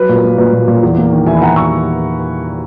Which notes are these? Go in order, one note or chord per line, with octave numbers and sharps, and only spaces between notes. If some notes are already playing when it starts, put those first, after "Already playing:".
Already playing: F#3 B4
A#2
A#4
A#3
A#2 B4
A#2
A#2
E2
A#3
D#3
E2 E5 G#5
B5
E2 F#5 A#5
C#6 E6